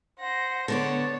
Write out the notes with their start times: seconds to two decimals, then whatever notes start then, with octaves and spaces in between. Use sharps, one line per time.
0.20 C5 F#5 A#6
0.68 D3 B3 C#5 D5 A5